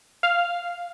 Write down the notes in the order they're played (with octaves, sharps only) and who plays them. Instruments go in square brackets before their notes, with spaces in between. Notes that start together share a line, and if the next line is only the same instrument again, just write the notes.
[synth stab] F5